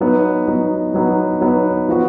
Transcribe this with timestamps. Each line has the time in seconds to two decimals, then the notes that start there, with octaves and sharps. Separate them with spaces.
0.01 F#3 B3 D#4
0.47 F#3 B3 D#4
0.94 F#3 B3 D#4
1.41 F#3 B3 D#4
1.89 F3 B3 F#4